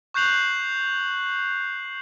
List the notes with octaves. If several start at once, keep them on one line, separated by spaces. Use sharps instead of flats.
C#6 F#6 G6 C7 F7 F#7